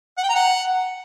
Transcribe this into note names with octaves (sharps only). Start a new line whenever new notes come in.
F#5
G5
A#5
F#5